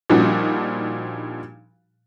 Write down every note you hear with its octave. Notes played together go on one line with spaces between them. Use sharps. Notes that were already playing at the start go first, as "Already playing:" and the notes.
A#2 F3 G3 D4 D#4 F#4